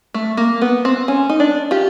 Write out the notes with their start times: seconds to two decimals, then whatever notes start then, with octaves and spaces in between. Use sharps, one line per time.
0.14 A3
0.37 A#3
0.62 B3
0.85 C4
1.08 C#4
1.30 D#4
1.40 D4
1.71 F4 G4